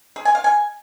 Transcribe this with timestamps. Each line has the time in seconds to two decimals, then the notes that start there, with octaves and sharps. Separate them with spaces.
0.16 G#4
0.25 G#5
0.35 F5
0.44 G#5